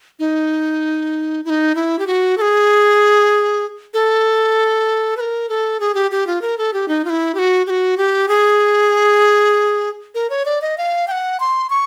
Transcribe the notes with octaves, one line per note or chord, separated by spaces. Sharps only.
D#4
E4
D#4
E4
G4
F#4
A4
G#4
A4
B4
A#4
A4
G#4
G4
G4
F4
A#4
A4
G4
D#4
F4
E4
G4
F#4
G4
F#4
G4
G#4
A#4
C#5
D5
D#5
F5
G5
F#5
C6
C#6